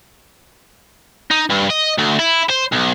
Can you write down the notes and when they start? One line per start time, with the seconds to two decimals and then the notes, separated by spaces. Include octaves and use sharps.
1.31 D#4
1.50 G2
1.70 D#5
1.98 D2
2.19 E4
2.50 C5
2.72 B1